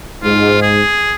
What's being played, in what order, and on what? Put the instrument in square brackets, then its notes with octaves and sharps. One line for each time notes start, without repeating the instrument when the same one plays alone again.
[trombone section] G#2 [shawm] F4
[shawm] G#4